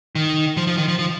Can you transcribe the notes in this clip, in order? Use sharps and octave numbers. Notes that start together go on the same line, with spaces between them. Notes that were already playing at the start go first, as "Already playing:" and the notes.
D#3
F3
F3
D#3
F3
F3